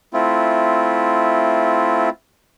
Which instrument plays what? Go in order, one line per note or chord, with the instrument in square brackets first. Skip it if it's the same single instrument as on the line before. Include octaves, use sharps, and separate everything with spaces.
[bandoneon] A3 C4 E4 F4